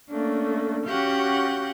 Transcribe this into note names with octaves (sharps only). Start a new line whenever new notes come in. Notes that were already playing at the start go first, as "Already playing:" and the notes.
A3 A#3 C#4 D4
C#4 F#4 G4 F5 F#5 G6